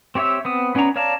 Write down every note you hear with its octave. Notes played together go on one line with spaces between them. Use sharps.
C4 G4 C#5 E5 E6
B3 C4 D#6
B3 C#4 D4 C#5 A#5
C#5 D5 F5 A5 A#5